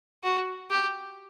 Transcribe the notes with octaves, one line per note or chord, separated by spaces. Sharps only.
F#4
G4